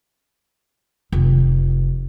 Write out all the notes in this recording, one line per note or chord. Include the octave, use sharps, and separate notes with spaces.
F1